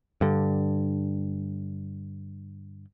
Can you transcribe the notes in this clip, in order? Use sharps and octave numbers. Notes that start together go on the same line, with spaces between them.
G2 D3